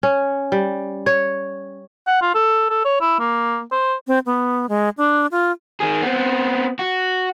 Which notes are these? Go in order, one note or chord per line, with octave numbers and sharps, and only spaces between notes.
C#4
G3
C#5
F#5
F4
A4
A4
C#5
E4
A#3
C5
C4
B3
G#3
D4
F4
D#3 G#4
B3 C4
F#4